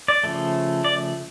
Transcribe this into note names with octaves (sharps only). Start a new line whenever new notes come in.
D5
C#3 F3 A3
D5